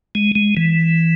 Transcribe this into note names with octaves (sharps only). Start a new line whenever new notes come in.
G#3
G#3
E3